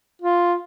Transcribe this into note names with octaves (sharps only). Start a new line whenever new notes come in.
F4